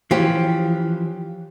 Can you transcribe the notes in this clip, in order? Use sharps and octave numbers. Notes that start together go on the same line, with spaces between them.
E3 F3 C#4 G4